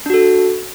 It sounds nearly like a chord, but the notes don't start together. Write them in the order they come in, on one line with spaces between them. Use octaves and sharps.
D4 F#4 A4